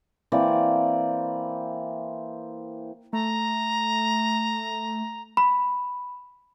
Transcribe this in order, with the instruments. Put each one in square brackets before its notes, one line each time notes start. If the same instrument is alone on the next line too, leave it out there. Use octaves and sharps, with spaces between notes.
[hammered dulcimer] E3 A#3 C4 D5
[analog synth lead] A3 [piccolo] A#5
[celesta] B5